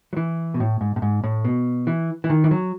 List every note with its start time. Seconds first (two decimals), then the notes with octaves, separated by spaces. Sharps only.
0.13 F#3
0.17 E3
0.54 B2
0.60 A2
0.81 G#2
0.96 A2
1.02 G#2
1.24 A2
1.45 B2
1.87 E3
2.24 E3
2.30 D#3
2.44 E3
2.51 F#3